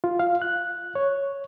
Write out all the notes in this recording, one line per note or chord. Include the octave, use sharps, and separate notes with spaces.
F4
F5
F#6
C#5